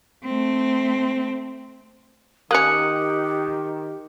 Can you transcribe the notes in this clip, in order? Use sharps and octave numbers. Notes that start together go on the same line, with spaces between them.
A3 C4
D#3 A#3 C#4 G4 D#6 F#6 C#7